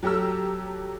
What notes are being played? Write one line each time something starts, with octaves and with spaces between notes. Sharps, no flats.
F#3 G4 A4 A#5 E6